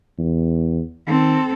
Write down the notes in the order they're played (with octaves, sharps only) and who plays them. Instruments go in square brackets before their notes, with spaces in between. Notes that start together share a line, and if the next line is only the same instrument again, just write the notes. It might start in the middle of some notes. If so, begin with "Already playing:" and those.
[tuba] E2
[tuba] D#3 [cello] C4 A4